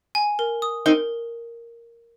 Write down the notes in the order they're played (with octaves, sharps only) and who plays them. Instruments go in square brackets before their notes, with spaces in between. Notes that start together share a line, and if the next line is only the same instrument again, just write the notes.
[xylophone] G#5
A#4
D#6
[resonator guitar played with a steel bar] C4 D#4 [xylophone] A#4